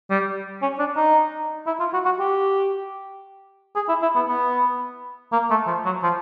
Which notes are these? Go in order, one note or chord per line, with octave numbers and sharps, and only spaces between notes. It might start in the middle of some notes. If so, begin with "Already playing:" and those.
G3
C#4
D4
D#4
E4
F4
F#4
F#4
G4
G#4
E4
E4
B3
B3
A#3
A3
F3
F#3
F3